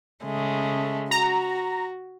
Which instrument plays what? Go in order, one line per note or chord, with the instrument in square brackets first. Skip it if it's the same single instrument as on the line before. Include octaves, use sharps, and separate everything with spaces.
[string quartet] C#3 G#3 A3
[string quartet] F#4 [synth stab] A#5